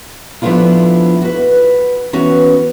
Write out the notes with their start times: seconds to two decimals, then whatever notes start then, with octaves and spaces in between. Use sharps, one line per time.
0.42 F3 A3 B3 D4 E4 F4
1.22 F#4 B4
2.13 E3 B3 C#4 F#4